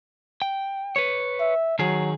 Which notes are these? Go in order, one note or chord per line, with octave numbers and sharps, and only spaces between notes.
G5
B4 C#5
E5
D#3 F#3 G#4